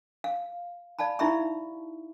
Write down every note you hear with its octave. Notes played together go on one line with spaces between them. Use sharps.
F5
D5 F5 A5 B5
D#4 E4 G4 E5 B5 C#6